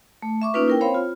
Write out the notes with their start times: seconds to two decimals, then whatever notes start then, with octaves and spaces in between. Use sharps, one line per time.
0.22 A3
0.42 E5 C#6 D6
0.54 A#3 C#4 D#4 F4 B4
0.68 E4 A#4 G5
0.81 C4 C5 C#5 F5 B5
0.94 F4